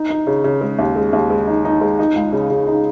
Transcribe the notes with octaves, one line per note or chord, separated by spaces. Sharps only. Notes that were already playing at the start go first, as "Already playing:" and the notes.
Already playing: D#4
D#4
C#3
C#3
G#3
D#2
G#3
D#2
G#3
D#4
D#4
G#3
D#4
C#2
C#3
C#3
D#4